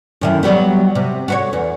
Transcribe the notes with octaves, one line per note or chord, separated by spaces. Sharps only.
F#2 D#3 E4
F#3 G3 B3
C3
F#4 B4 C#5
E2